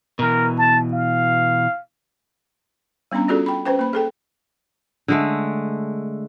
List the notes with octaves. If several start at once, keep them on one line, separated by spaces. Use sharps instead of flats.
B2 E3 A#4
A5
F5
G3 B3 C#4 D4 A#5
C#4 F4 F#4 G#4 A4 D5
G5 B5
C#4 B4 C5 G5
A#3 B5
G#4 A4 G5
D3 G#3 A3